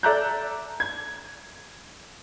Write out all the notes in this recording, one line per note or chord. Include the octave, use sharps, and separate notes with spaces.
A4 D5 E5 A#5 F#6 G6
G#6